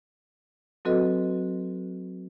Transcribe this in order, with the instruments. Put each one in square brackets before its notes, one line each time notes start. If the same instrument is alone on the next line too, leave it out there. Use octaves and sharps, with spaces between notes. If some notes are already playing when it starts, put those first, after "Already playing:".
[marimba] F#3 C4 F#4 A4 B4 D#5